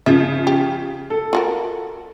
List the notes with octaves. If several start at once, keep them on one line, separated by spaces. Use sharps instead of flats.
C#3 F3 E5
G4
A4
F4 F#4 A#4